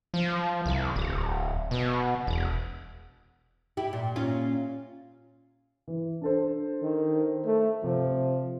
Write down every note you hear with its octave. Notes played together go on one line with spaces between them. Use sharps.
F3
C2
D1
B2
E1
E4 G4
A#2
A#2 C#4 F4
E3
D4 A4 C5
D#3
A3
C3 F3